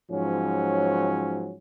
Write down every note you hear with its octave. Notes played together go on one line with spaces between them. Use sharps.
G#2 F3 F#3 C#4